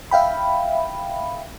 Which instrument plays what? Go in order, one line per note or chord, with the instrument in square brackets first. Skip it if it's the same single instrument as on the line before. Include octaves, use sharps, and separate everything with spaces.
[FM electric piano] E5 F5 G5 B5